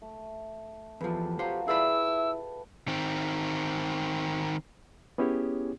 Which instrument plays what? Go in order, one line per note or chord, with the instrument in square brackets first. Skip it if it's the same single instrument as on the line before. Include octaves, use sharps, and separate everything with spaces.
[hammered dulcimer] A3
[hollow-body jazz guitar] E2 F3 [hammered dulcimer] G4 A4 B4
[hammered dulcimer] F3 F#3 [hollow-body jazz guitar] G4 C5
[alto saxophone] E4 [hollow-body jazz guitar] G#4 D5 B5 [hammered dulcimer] B4 E5 G5 [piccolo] E6
[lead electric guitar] D#3 C4
[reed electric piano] B3 C#4 E4 G4 G#4 C#5